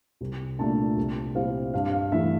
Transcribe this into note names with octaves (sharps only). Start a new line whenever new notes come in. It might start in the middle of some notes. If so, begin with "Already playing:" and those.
C2
A#2 A3 D4 A5
C2
A#2 G3 C4 E4 F5
G2 F5
F5
E3 A3 E5